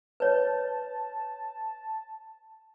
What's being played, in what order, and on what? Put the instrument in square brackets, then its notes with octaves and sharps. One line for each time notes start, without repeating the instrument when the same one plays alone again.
[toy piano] B4 C#5 [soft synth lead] A5